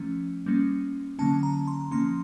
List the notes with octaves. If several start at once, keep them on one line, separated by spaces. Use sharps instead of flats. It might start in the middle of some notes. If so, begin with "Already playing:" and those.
Already playing: F3 A3 C#4
G3 A#3 C#4
D3 F#3 A#3 C#4 A5
A#5
C6
F3 A#3 C#4 C6